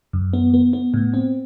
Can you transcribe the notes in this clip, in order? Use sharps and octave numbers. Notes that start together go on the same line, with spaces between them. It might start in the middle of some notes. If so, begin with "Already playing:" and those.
F#2
B3
B3
B3
A2
C4